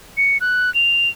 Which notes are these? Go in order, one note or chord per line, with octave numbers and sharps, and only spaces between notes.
C#7
F#6
F7